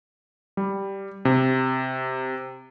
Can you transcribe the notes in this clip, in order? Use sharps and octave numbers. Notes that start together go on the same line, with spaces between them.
G3
C3